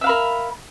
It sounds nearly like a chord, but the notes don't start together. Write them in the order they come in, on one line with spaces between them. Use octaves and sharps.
E5 F5 B5 A#4